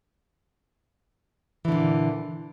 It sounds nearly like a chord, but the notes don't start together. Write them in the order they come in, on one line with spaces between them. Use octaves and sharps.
E3 D3 A#2